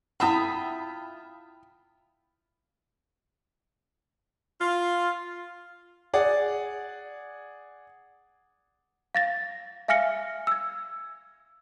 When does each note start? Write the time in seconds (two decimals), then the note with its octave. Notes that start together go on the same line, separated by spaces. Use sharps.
0.20 E4 F4 E5 F#5 G5 B5 D#6
4.60 F4
6.14 G#4 D5 F#5
9.15 F5 A6 A#6
9.88 E5 F5 G#5 F6 A#6 C#7
10.47 E6 G#6